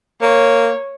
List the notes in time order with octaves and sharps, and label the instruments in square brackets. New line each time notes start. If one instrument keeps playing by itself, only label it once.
[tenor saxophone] A#3 [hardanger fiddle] C#5